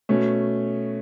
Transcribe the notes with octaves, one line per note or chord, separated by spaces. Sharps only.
B2 A3 C#4